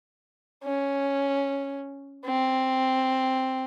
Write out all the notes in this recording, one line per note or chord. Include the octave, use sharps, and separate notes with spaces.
C#4
C4